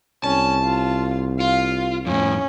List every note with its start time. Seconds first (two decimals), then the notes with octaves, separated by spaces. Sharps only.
0.24 C2 C#4 A5
0.64 F4
1.40 F4 F5
2.07 F2 A2 C#4